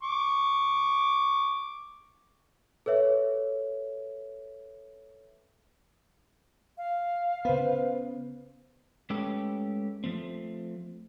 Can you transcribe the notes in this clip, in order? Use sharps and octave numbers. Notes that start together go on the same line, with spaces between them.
C#6 D6
A4 B4 C#5 E5
F5
C#3 B3 B4 C5
G#3 A3 C#4 G4 A4 B4
F3 A3 C4